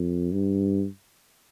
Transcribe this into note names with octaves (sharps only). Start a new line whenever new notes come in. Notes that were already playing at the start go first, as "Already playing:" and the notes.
Already playing: F2
G2